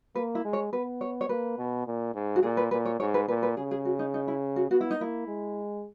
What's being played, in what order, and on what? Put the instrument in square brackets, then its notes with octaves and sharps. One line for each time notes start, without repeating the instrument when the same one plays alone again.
[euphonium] A#3 [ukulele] B4
[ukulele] E4
[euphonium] G#3
[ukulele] C#5
[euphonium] B3 [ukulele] B4
[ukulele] C#5
C#5
[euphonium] A#3 [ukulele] B4
[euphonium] B2
A#2
G#2
[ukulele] F#4
[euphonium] A#2 [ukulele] G#4
[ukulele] B4
[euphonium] A#2 [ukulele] B4
[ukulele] C#5
[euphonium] G#2 [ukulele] C#5
[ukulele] B4
[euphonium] A#2 [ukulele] B4
[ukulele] B4
[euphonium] C#3 [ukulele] G#4
[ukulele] G#4
F#4
D#4
D#4
E4
F#4
[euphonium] B3 [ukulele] F#4
[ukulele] E4
D#4
[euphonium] A#3 [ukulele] E4
[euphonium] G#3